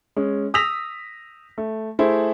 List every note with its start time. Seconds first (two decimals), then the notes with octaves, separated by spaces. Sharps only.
0.16 G#3 C#4
0.54 D#6 E6 A#6 B6 F7
1.58 A3
1.99 A3 E4 G#4 C5